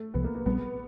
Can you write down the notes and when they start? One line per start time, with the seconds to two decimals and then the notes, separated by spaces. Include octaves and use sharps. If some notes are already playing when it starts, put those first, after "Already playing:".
Already playing: A3
0.14 C2 C3 F3 B3
0.24 A#3
0.35 A#3
0.46 A#1 A#2 G3 B3 C4